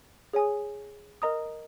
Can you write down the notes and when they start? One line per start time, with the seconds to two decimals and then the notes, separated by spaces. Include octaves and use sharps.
0.33 G#4 C#5 G#5 D#6
1.22 A#4 D#5 A#5 D#6